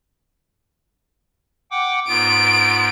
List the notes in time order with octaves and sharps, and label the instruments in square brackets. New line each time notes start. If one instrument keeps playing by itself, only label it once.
[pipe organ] F#5 G5 D6
[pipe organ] G#2 B3 F4 [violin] D7